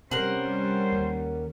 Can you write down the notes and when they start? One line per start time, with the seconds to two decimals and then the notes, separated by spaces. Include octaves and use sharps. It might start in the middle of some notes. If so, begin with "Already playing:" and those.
0.11 C3 G3 C#4 A#4 C5 F#5
0.92 D#2